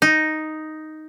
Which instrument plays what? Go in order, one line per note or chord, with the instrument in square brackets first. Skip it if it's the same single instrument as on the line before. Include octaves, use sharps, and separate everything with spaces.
[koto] D#4